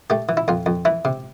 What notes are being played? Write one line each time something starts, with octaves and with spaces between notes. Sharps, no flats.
A3 G4
E3
E4
F2 F4
F2
E3 E4
C3